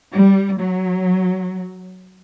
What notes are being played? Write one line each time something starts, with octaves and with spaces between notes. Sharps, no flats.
G3
F#3